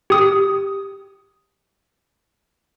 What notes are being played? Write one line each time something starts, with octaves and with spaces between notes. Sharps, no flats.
G4 D#6